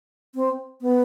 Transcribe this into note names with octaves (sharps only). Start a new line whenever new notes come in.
C4
B3